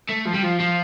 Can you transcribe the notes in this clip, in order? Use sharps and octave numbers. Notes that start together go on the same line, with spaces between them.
A3
F3
G3
F3
F3